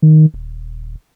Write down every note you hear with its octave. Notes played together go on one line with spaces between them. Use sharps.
D#3
D#1